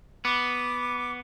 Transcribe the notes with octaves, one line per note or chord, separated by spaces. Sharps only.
B3 D6